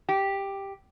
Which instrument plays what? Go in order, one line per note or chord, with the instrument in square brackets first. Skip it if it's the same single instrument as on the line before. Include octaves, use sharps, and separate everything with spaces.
[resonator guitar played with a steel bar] G4